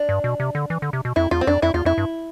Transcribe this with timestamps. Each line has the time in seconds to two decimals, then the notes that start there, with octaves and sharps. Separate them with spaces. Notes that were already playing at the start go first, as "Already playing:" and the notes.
Already playing: D4
0.09 G2
0.24 B2
0.40 C3
0.55 D3
0.70 E3
0.82 D3
0.93 C3
1.05 B2
1.16 F2 E4
1.31 E2 F4
1.41 C4
1.47 F2 D4
1.62 F2 E4
1.74 E2 F4
1.85 F2 E4
1.98 G2